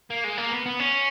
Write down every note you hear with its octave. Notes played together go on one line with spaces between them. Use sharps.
A#3
G#3
A#3
B3
B3
C#4